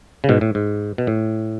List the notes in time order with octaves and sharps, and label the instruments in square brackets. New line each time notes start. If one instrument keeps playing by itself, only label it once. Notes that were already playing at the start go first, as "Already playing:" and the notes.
[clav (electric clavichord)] C#3
G#2 B2
A2
G#2
B2
A2